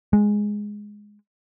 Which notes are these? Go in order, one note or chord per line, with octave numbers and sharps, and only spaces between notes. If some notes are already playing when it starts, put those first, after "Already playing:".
G#3